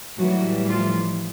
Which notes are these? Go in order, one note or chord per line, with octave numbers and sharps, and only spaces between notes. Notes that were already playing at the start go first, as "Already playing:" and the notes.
A2 E3 F#3 G3 F#4
F3 F4